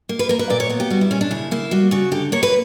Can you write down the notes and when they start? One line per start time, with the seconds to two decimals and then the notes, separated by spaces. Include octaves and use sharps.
0.09 A#3
0.19 B4
0.29 A#3 A#4
0.39 B4
0.50 A#2 D5
0.60 C#5
0.69 B3 A#4
0.80 G4
0.90 G3 F#4
1.01 E4
1.11 A#2 C#4
1.21 D4
1.31 C#3 E4
1.51 A#3 E4
1.71 G3 F#4
1.91 C#3 F#4
2.12 D3 G4
2.32 A#3 C#5
2.43 B4